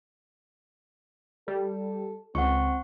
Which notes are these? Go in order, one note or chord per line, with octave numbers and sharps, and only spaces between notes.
G3 A4
C#2 C4 F#5 C#6